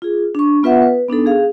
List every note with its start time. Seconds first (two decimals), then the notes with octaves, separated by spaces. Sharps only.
0.02 F4 G#4
0.35 D4 C#6
0.63 B3 F4 B4 E5 F#5
0.82 B4
1.09 B3 D4 D#4 A4
1.26 G#4 F5